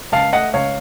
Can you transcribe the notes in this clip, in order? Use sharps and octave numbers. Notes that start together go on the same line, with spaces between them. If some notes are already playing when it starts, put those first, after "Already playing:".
C#2 F5 A5
A3 D#5 F#5
C#2 C#5 F5